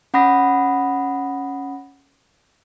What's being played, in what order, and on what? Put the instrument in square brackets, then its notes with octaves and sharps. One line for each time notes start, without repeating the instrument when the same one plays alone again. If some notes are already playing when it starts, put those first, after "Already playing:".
[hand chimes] C#4 F#5 B5 D#6 A#6